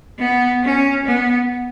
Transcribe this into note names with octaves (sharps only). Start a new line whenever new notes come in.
B3
C#4
B3